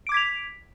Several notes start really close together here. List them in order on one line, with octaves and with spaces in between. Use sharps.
D7 D6 G#6 B6 F7